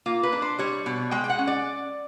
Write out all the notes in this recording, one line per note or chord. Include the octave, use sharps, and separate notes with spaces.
A#3 F4
B4
D4
C5
G3 C#5
B2
G#3 G5
G5
F#5
C#4
D5